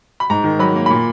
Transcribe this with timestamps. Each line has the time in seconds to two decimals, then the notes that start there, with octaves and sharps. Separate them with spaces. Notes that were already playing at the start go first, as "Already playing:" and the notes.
0.20 B5
0.30 G#2 A#5
0.44 D#3
0.59 F#3 B5
0.75 A#3
0.86 A#2 B5